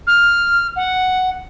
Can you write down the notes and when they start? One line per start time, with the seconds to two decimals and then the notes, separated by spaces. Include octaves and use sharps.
0.07 F6
0.76 F#5